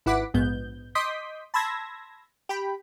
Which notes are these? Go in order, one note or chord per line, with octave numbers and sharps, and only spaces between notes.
G#1 E4 B4 F#5 D6 B6
A#1 G#2 B3 G6
D#5 C6 D6 D#6 G6 B6
A5 B5 C6 E6 G#6 A#6
G4 G5 B5